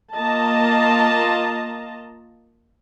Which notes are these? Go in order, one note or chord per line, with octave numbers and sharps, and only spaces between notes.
A#3 F4 D#5 A5 A#5